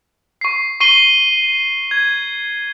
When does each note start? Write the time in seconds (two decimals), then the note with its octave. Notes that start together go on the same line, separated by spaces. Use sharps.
0.41 C#6 C7
0.80 C#6 C7 D#7 G7
1.91 G#6